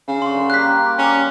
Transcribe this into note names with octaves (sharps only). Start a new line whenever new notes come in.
C#3
F#2 D3 C6 C#6
G3 A#3 G4 F#6 B6
C#4